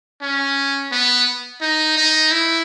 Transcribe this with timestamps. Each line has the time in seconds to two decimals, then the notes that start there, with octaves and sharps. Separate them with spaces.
0.22 C#4
0.92 B3
1.61 D#4
1.97 D#4
2.31 E4